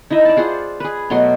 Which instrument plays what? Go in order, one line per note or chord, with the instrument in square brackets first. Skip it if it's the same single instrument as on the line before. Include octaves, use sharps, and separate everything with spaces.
[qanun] D#4 E4 D#5 E5
D5 A5
F4 G#4 C5 F#5
G#4 B4
B2 F#3 A3 C6